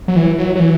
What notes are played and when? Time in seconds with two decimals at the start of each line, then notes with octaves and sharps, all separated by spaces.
0.08 F#3
0.16 E3
0.38 F#3
0.56 F#3
0.60 E3